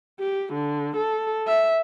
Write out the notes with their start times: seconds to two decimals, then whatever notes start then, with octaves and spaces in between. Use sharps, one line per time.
0.20 G4
0.53 D3
0.97 A4
1.48 E5